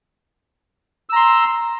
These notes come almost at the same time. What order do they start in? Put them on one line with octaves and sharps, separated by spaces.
E6 A#5 C6